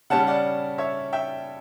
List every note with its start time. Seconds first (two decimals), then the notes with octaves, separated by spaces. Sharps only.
0.10 C#3 G3 C#4 F#5 A5
0.27 D5 F#5
0.78 C#5 E5
1.13 E5 G5